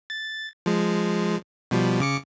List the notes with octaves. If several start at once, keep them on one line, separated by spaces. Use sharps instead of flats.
A6
F3 G#3
B2 F3 G3
C#3 D6 C#7